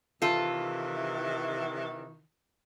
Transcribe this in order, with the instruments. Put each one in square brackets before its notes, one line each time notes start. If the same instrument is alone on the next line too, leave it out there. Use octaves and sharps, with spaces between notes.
[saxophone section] C3 D#3 E3 [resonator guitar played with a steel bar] F4 A4